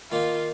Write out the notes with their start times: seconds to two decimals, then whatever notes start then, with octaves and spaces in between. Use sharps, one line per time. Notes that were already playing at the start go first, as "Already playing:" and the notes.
0.11 D#3 A#3 D#4 F4